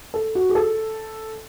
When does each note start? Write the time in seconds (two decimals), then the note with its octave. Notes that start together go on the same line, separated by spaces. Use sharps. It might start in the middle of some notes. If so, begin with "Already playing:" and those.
0.14 A4
0.35 F#4
0.49 G#4
0.55 A4